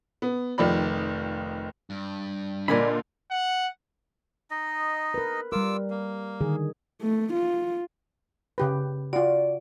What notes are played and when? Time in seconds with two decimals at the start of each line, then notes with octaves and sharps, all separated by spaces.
0.22 B3
0.58 F1 D#3 F3 D5 B5
1.90 G2
2.68 A#2 D3 A#4 D5 D#5 G#5 B5
3.31 F#5
4.51 D#4 D#5
5.14 A#4 B4
5.52 G3 F4 A#4 D6 E6
5.90 A#3
6.41 D3 D#3 G#4
7.02 A3
7.33 F4
8.58 C#3 G4 B4
9.13 F4 F#4 D5